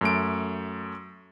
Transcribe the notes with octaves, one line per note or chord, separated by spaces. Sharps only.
F#2 A3 D7